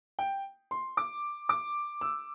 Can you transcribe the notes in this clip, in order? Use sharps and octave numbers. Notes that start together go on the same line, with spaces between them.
G5
C6
D6
D6
E6